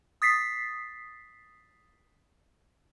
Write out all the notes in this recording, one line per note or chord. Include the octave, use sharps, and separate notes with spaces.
D#6 A6 B6 C7